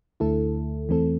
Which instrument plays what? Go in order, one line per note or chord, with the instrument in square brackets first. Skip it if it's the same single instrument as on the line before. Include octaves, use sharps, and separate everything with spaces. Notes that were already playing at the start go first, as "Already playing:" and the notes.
[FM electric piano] D2 D3 A3 E4 A4
E2 E3 A3 C4 A4